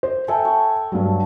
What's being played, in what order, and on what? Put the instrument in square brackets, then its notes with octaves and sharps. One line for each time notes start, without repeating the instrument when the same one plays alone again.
[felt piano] C5
[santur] A4 G5 [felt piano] E5 G#5
[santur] C#5
[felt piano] G2 F#3